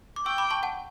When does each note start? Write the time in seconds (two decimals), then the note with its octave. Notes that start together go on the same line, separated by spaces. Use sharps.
0.16 D6
0.26 G5 C#6 E6
0.38 B5 D6
0.51 A5 C#6
0.63 F#5 A5